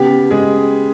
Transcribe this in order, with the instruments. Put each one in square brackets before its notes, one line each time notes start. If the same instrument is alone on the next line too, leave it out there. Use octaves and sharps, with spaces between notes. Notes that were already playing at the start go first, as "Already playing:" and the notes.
Already playing: [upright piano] C#3 B3 G4
G#3 G#4